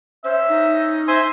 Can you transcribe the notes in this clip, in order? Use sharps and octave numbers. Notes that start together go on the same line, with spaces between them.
C#4 C5 E5
D#4
C5 E5 G#5 C6